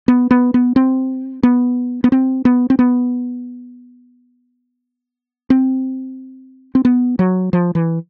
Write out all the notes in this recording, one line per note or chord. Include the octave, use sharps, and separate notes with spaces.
B3
B3
B3
C4
B3
B3
C4
B3
C4
B3
C4
C4
B3
F#3
F3
E3